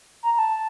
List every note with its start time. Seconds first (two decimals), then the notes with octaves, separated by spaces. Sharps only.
0.23 A#5
0.34 A#5
0.39 A5